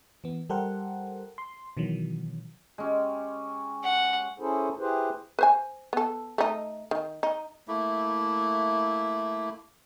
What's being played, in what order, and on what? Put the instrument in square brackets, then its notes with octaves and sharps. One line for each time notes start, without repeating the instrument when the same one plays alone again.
[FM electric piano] E3 B3
G3 G4 A4 A#4 C5 F#5
C6
B2 D#3 E3 F#3
[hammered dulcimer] G#3 C#4 G4
[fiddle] F#5
[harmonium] C#4 E4 G#4 A4 C5
E4 G4 G#4 B4 C5
[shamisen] B4 C5 G#5
B3 A4
A3 D#4
D#3
D#4
[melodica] A3 A#3 E4